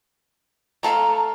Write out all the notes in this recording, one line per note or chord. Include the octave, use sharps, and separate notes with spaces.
A3 A4 F5 A#5